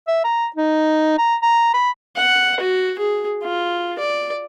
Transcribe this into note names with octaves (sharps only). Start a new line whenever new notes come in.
E5
A#5
D#4
A#5
A#5
B5
F#5
F#4
G#4
F4
D5